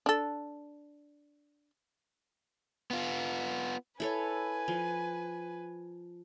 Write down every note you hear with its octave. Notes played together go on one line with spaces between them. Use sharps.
D4 A4
B3 F4
E4 A4 B4 C#5 G#5
F3